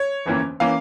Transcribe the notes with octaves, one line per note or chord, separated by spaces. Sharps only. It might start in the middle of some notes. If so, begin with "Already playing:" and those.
Already playing: C#5
G1 F2 E3 A#3 C#4
E3 A#3 C#4 F5